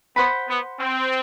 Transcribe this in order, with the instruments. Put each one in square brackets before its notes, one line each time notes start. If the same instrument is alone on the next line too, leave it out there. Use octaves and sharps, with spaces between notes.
[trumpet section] B3 [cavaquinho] C5 F#5 B5
[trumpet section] B3
C4